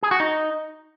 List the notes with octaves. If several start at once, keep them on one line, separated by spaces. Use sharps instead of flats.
G#4
F#4
D#4